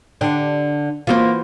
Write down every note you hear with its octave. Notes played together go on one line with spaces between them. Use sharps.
D3 D4 G4
E3 A#3 F4 F#4 C5